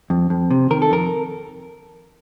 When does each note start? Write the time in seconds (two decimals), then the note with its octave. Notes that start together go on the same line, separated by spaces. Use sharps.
0.10 F2
0.30 F2
0.51 C3
0.71 D#3 A#4
0.82 A4
0.90 F2 A#4